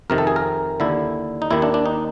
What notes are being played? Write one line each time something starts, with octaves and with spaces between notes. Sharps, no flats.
F2 C3 D#3 A#4
A4
G#4
A#4
D#2 D3 E4
D#4
D#2 D#3 E4
D4
D4
D#4